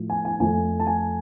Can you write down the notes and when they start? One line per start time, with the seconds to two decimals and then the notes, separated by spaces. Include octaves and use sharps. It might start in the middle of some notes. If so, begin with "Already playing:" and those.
Already playing: A2 F3
0.10 G#5
0.25 G#5
0.40 F2 F3 A3 G#5
0.79 A5
0.87 G#5